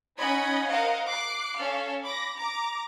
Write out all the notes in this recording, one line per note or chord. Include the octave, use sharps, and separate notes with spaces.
C#4 D#4 D#5 F#5 B5 G#6
A#4 C5 D#5 F5 F#5
D6 F#6 C7
C#4 A4 C#5 F5
B5 D6 A#6
A#5 D6